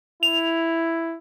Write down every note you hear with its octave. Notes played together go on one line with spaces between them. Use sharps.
E4 F7